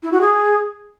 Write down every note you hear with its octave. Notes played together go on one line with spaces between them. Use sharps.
E4
F#4
G#4